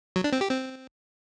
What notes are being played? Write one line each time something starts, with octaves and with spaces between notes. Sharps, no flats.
F#3
D4
C4
G4
C4